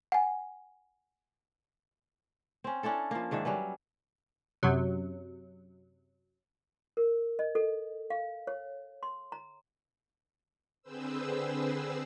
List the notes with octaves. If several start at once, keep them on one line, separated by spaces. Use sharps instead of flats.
F#5 G#5
C4 C#4
C#4 D4 E4 A4
F3 A#3
G#2 D#3 D4 E5
F#3 G3 C#4 B4
F#2 C3 F#3
A#4
D#5
A4
F5
C#5
C6
A#5
D3 C4 G#4 B4 C5 E6